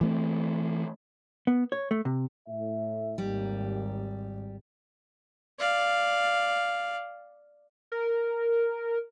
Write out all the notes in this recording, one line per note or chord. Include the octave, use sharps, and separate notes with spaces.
E3 A3 C4
B3
C#5
A3
C3
A2 E5
G#1 D#2 G3
D5 F5
A#4